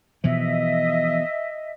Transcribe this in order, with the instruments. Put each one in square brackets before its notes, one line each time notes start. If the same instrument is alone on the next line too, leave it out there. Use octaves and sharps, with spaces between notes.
[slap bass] B2 E3 F3 [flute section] D#5 E5